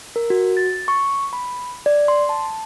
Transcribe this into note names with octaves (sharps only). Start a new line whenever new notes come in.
A#4
F#4
A6
C#6
B5
D5
C6
A5